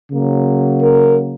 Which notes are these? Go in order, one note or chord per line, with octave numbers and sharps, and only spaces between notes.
C#3 F#3 A#3
A#4